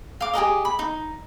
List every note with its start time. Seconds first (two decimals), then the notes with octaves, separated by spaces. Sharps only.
0.21 F5 D6
0.34 G4 G#4 A#4 D#5
0.65 B5
0.79 D#4